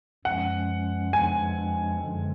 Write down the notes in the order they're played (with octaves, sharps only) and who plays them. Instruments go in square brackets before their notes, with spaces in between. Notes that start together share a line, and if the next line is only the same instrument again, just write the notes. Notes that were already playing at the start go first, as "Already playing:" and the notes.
[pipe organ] F#2 F3 G#3 C#4 [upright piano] F#5
[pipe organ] F2 F3 G#3 D4 [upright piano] G#5
[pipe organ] F#2 D3 F3 G#3